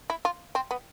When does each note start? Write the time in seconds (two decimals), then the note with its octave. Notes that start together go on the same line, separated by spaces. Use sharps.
0.10 E4
0.25 F4
0.55 C4
0.71 B3